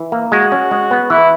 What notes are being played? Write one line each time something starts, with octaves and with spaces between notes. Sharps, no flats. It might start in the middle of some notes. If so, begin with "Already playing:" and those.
Already playing: E3
A#3
G#3 F#4
C#4
G#3
B3
E3 E4